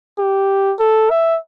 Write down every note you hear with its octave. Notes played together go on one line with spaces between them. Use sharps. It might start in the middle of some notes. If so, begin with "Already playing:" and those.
G4
A4
E5